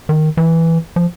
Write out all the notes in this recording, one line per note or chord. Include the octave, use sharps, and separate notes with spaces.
D#3
E3
F3